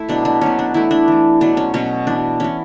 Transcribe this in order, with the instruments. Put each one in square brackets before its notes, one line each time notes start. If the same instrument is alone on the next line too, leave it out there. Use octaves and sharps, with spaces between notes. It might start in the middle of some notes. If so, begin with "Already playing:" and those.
Already playing: [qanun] A3 E4
B2 F#3 B3 D4
D4
B2 F#3 B3 C#4
D4
E3 A3 E4
D4
E3 A3
B2 F#3 B3 D4
C#4
B2 F#3 B3 C#4
E3 B3 D4
E3 B3 C#4